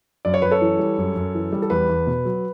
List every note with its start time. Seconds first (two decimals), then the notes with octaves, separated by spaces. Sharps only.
0.25 F#2 D5
0.34 C#5
0.42 F#2 B4
0.51 A4 C#5
0.61 E3
0.79 G3
0.98 F#2
1.16 F#2
1.34 E3
1.52 G3
1.62 A4
1.70 E2 B4
1.89 E2
2.07 B2
2.25 F#3